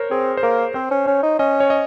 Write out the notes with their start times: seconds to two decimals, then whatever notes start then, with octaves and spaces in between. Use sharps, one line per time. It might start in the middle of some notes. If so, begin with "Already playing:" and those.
Already playing: A#4 C5 C#5
0.11 C4 G#4
0.37 C5
0.43 A#3 A#4
0.74 C4 C5
0.91 C#4
1.06 C#4 C#5
1.23 D#4
1.39 C#4 D#5
1.60 C#5
1.70 D#5